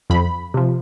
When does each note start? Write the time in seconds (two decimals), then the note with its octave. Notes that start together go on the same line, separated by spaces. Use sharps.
0.10 F2 B5
0.54 C3 F3